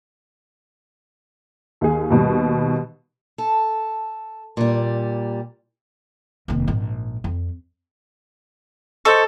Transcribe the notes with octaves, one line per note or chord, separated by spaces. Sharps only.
D#2 G#4
D#2 B2 G3
A4
A#2 G3
F1 D#2
A#1 G#2
F2
A4 C5 D#5 C#6